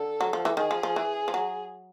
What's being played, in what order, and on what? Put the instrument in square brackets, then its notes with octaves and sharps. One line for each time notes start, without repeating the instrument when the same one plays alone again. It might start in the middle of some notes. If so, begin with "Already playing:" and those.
Already playing: [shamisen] D3 [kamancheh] A4
[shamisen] F#3
F3
E3
[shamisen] D#3 [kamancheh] G#4
[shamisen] F3
F3
E3
F3
F#3